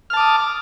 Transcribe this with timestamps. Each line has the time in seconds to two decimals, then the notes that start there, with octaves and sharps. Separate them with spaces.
0.10 F6
0.13 A5
0.17 D6
0.20 D#6